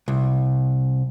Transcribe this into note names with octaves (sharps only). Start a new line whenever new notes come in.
C2